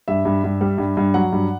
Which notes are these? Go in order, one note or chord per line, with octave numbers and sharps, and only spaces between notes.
G2 E5
G2
G2
G3
G2
G2
F#3 F#5
G2